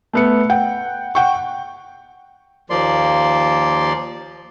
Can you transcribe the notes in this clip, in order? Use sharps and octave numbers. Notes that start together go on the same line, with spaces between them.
A3 B3 C#7
F#5 G5
F#5 G5 C#6
D#2 F3 A#3 D5 C6